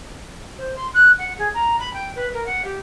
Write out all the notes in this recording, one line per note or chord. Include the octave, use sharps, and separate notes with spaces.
C5
C6
F#6
F#5
G#4
A#5
B5
G5
B4
A#4
F#5
G4